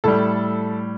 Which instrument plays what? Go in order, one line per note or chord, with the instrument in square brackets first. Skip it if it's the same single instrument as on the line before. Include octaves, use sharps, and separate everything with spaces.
[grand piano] A2 G3 A4